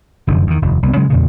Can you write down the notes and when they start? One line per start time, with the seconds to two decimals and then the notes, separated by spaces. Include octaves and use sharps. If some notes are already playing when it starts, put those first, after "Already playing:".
0.27 F1 F#2 D3 F3
0.47 E2 D#3
0.62 F1 D#2
0.83 C2 B3
0.96 C#3 F#3 G#3
1.10 E2 A#2 C#3